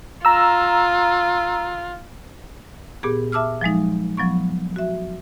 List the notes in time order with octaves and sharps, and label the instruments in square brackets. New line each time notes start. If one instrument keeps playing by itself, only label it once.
[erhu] F4 [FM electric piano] A#5 E6
[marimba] A#2 B3 G4 G#4
E5 A5 D6 E6 F6
F3 F#3 G#3 D#4
F3 F#3 B3 C#6
F#4 E5